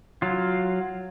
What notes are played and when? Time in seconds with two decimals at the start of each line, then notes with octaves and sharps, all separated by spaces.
0.22 F#3 F4